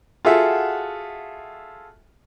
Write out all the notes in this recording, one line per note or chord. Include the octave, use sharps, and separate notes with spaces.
F4 F#4 G#4 A4 E5 F#5